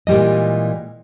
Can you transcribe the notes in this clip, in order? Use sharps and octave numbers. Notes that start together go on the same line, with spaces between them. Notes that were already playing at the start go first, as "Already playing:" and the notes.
A#2 E3 G3 G#3 D#5